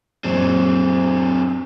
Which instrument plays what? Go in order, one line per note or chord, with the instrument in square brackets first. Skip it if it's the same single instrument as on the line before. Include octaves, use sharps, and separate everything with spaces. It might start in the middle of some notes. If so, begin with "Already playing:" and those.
[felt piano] A#1 F#2 [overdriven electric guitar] F#3 C4